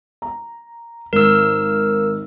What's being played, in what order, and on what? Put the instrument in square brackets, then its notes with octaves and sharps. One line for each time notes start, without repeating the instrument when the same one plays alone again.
[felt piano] A#5
[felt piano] G#1 [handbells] A#4 E6